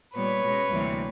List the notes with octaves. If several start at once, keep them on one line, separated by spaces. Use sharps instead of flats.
A#2 G3 B3 B4 C#5
B2 G#3 C#4
D2 C3 E3 G3 A#3